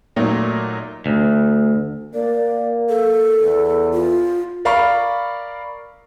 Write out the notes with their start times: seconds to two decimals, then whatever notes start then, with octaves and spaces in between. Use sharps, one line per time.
0.16 A#2 F#3 A3 A#3 D#4
1.06 D2
2.14 A#3 D5
2.89 A4
3.42 E2
3.93 F4
4.65 A#4 D5 F5 B5 C#6